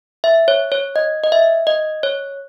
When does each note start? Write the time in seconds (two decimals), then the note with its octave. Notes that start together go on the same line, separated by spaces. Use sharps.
0.24 E5
0.48 C#5
0.72 C#5
0.96 D#5
1.24 D#5
1.32 E5
1.67 D#5
2.03 C#5